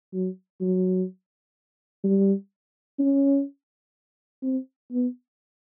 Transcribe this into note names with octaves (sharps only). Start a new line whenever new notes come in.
F#3
F#3
G3
C#4
C4
B3